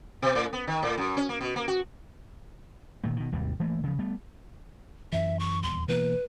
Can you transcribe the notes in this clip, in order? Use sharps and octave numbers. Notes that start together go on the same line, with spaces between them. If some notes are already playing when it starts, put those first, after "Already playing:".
B2
A2
B3
D#3
A2
F#2
C#4
A#3
B2
A#3
F#4
A#2 D#3 A3
B2 D#3
G#1 D#2 C3 G3
E3 A3 A#3
C#3 F3
G3 A3 B3
F#2 E3 E5
C#6
D#1 E2 C6
B2 E3 A#3 B4